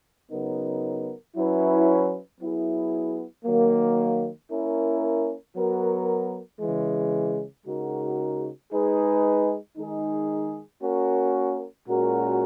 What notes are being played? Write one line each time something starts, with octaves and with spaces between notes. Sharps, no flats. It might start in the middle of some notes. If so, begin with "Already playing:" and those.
C#3 F#3 B3 D#4 A#4
F#3 C#4 E4 B4
F#3 B3 E4 G#4
D#3 F#3 A#3
A#3 C#4 E4 A#4
F#3 B3 F#4 A#4
C#3 E3 G#3
C#3 G#3 D#4 F#4 A#4
G#3 D#4 G#4 B4
D#3 G#3 D#4 G#4
A#3 C#4 F#4 A#4
A#2 G#3 C#4 F#4 A#4